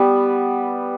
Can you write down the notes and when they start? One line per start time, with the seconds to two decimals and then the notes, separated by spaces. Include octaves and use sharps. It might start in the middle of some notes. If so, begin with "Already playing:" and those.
Already playing: G3 B3